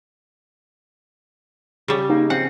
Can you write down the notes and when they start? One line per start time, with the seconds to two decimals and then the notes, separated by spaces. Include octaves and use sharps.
1.88 C#3 G3
2.09 A#3 D#4
2.30 F3 C4 C#4 F#5